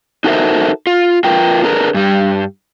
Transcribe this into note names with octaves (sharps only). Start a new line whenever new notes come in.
D#4 F#4 A4 A#4 C5 E5
F4
F4 A#4 B4 G5
D4 G#4 A#4 B4
G2 G3